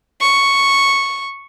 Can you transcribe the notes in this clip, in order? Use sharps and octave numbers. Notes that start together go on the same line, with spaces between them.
C#6